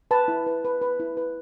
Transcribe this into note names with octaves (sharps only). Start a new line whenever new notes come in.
B4 A5
E4
B4
B4
B4
E4
B4